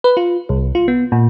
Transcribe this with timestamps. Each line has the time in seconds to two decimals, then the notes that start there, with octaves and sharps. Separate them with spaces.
0.04 B4
0.17 F4
0.49 C2
0.75 F4
0.88 B3
1.12 A#2